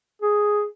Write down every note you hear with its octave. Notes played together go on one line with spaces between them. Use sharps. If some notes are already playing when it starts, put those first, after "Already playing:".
G#4